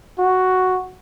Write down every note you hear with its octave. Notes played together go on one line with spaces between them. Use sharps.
F#4